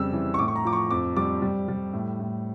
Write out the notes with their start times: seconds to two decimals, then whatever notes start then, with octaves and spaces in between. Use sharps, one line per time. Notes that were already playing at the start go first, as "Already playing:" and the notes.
Already playing: F2 C#3 G3 E6
0.13 E3
0.34 C#6
0.39 A2 D6
0.48 C#6
0.55 A#5
0.64 F3 D6
0.73 C#6
0.90 F2 D6
1.16 G3 D6
1.42 G3
1.68 G3
1.93 A2
2.20 A2